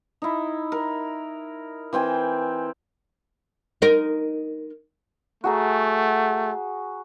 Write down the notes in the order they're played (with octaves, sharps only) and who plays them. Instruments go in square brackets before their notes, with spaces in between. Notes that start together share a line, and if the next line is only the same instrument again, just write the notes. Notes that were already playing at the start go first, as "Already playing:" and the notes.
[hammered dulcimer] D#4 E4
A#4
E3 C4 G5 G#5
[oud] D#4 A#4
[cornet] A3 [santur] F#4 G#4 A#5